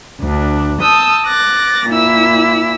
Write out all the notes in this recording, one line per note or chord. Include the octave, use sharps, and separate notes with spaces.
D2 D4
A5 D#6 E6 G6
D6 F#6 A6 A#6
A#2 E4 E6